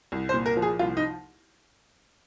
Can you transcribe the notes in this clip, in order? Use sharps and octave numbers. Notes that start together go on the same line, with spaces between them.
C2
C5
A#2
A#4
F3
G#4
C2 F4
D#4